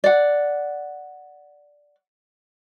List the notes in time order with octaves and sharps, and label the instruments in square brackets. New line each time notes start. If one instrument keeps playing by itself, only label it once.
[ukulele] D5 F#5